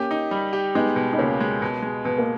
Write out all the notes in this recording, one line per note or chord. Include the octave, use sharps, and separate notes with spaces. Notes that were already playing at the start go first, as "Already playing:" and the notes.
Already playing: A#3 C#4 G4
D#4
G3
G4
G#3 B3 D#4
B2
D#4
C#2 A#3 C#4
G#3
B2
G#3
B2 B3
A#3